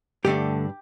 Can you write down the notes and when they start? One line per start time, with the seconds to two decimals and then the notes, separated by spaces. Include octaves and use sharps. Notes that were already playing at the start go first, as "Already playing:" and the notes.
0.24 G2 D3 A3 D4 G4